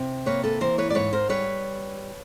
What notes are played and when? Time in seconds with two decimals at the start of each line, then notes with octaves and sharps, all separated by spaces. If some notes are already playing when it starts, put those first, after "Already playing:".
Already playing: C3
0.26 A#3 B4 C#5
0.44 A4 B4
0.61 E3 A#4 C5
0.78 B4 C#5
0.90 D5
0.95 G#2 B4 C#5
1.13 A#4 C5
1.29 G3 B4 C#5